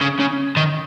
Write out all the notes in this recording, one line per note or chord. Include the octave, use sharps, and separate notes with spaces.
C#3
C#3
D#3